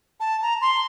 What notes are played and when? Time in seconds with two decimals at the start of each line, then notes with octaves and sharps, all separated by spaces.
0.20 A5
0.42 A#5
0.61 C6